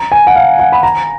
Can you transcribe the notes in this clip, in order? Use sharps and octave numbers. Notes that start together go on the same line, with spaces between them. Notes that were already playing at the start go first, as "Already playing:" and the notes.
Already playing: A#5
G#5
F#5
F5
F#5
B5
A#5